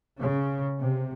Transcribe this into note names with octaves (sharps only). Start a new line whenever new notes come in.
C#3
C3